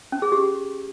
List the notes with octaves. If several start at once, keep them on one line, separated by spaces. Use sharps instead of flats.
C#4
G#4
G4